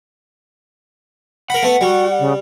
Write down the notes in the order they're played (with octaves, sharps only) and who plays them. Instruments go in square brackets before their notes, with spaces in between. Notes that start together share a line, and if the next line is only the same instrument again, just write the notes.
[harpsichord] A#4 B5 [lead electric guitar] F#5
[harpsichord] A3 B3
[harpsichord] G3 [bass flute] F#4
[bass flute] C#3